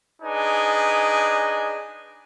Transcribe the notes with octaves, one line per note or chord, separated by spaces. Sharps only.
D4 D#4 G#4 B4 G#5